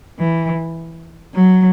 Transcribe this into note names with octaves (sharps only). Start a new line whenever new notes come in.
E3
F#3